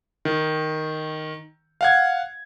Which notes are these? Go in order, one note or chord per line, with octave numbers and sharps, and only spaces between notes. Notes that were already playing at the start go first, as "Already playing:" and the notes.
D#3
F5 F#5 G#6